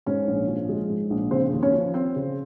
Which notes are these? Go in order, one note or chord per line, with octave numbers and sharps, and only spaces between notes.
G#2 C#4 C#5
A#1
F3
G#3
G#2
A#1
C#3 C4 C5
D#2
C#4 C#5
F3
C4 C5
C#3